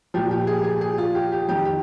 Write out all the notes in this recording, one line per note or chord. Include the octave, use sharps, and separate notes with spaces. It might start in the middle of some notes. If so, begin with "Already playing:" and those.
A#2 F3 G4
G4
G#4
G#4
G#4
F4
G4
G4
F2 D#3 G4
G4